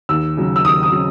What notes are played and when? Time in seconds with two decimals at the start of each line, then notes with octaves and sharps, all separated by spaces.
0.09 D#2 E6
0.37 C#3 F#3
0.56 E6
0.64 D#2 D#6
0.83 D#6
0.92 C#3 F#3